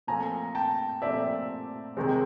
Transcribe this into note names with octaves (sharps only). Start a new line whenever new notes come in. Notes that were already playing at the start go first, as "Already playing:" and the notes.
A#2 F3 A3 C4 G#5 A#5
G5 A5
A#2 F3 A3 C4 D5 E5
C3 D#3 G#3 C4